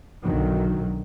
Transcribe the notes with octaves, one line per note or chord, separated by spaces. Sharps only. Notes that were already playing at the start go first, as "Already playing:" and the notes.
B1 D3 D#3 F#3